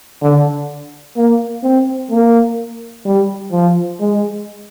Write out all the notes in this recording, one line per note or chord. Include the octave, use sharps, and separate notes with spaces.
D3
A#3
C4
A#3
G3
F3
G#3